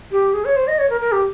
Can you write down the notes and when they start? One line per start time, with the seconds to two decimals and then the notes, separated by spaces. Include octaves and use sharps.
0.12 G4
0.34 G#4
0.45 C#5
0.56 C5
0.67 D#5
0.79 C#5
0.90 A#4
1.01 A#4
1.12 G4